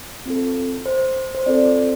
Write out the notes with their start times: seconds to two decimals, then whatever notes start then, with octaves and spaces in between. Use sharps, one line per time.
0.26 C4 F4 A4
0.86 C5
1.35 C5
1.46 C4 F4 A4 D5